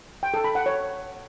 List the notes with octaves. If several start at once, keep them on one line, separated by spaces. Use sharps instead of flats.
G5
A4
B5
F#5
C#5